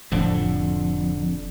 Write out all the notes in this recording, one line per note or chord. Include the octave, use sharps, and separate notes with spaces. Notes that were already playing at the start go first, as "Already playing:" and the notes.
F1 F2 A2 D3 F3